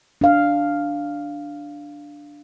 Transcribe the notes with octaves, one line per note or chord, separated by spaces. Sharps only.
D4 F5